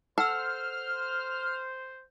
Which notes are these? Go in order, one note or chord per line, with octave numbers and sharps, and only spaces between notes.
A4 C5 F#5 E6 F6